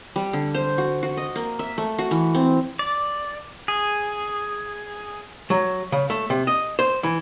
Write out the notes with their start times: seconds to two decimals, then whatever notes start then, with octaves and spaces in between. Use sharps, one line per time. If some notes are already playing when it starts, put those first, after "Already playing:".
0.16 G3
0.33 D3
0.55 C5
0.78 F#4
1.03 F#4
1.17 D#5
1.36 A#3
1.59 E5
1.78 A3
1.98 F#4
2.11 E3
2.35 C4
2.79 D5
3.68 G#4
5.50 F#3
5.92 C#3
6.10 A3
6.30 C3
6.47 D#5
6.79 C5
7.03 E3